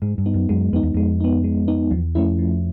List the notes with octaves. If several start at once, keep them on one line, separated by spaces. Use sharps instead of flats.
G#2 G#3
G2
B3 D#4
F#2
F#2 G#3
F2 B3 D#4
E2
F2 G#3
B3 D#4
G#3
B3 D#4
E2 F3
F2 A3 C#4 E4
F3